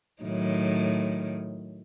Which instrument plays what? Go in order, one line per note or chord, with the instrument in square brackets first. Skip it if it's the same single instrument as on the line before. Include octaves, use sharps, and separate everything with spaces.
[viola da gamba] A2 D#3 F#3